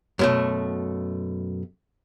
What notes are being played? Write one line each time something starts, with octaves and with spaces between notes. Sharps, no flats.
F#2 B2 A3